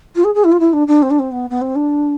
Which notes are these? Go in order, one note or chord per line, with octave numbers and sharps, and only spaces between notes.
F4
G#4
G#4
E4
F4
E4
D4
D4
C4
D4
C4
B3
B3
C4
D4